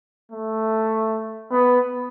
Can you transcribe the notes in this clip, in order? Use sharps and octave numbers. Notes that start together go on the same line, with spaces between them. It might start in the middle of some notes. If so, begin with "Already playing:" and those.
A3
B3